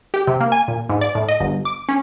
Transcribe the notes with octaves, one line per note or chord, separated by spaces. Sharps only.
G4
C3
A#3
G#5
A#2
G#2
D5
A2
D#5
G1
D6
C#4